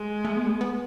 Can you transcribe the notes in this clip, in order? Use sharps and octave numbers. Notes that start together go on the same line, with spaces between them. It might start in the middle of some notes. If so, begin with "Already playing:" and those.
Already playing: G#3
A3
B3
A3
B3